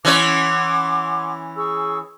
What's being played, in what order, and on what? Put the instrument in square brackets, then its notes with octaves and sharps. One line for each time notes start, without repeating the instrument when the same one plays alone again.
[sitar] E3 C#4 C#5 [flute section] F#5 C6 D6
[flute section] G#4 C#6 E6